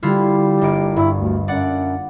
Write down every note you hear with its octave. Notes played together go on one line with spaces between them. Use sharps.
D3 G3 E4 F4
G1 A#3 D7
G2 E4
D2
F#2 D5 F#5